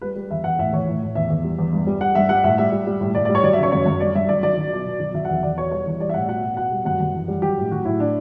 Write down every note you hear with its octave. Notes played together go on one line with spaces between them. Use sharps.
G3 B4
G3
E2 E5
E2 F#5
A2 E5
E3 C#5
A2
A2
E2 E5
E2
G3
E2
G2
G3
G3 F#5
G2 E5
G3 F#5
A2 E5
G3 E5
G3
G3
A2
A2 D5
D5
G3
C#5
F#3 D5
E5
C#3 C#5
F#2 C#5
F#2
G2 D5
G2 E5
F#3 D5
F#3 D5
F#3
B2
B2
F#3
F#3 E5
F#5
E2
E5
E2 D5
B2 C#5
G3 C#5
E3
G3 D5
E5
A2 F#5
B2 F#5
B2
B2 F#5
G3
F#2 F#5
F#2
E3
G3
F#3 G4
A2
F#3 F#4
A2 E4
D4